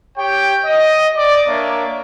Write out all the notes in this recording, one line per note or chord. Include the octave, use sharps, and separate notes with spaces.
G4 C#5 G5
D#5
D5
A#3 D4 C#5 E5